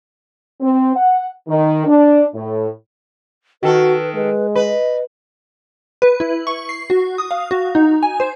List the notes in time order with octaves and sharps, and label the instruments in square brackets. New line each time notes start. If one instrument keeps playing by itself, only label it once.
[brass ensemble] C4
F#5
D#3
D4
A2
[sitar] D#3 A4 [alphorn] F#4 [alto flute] B4
[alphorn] G#3 [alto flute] B4
[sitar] B4 [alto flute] D#5
[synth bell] B4
E4
C#6
C7
F#4
D#6
F5
F#4
D#4
G#5
C5